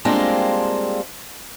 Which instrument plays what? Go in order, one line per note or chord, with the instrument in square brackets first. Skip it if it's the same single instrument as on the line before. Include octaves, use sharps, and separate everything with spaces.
[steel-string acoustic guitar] G3 G#3 A#3 C4 D4 F4